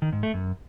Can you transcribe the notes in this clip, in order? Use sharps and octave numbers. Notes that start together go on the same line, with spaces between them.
D#3
G#2
A3
F#2